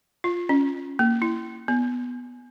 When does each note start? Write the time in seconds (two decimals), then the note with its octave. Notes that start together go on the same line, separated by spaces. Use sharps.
0.24 F4
0.49 C#4
0.99 A#3
1.22 E4
1.68 B3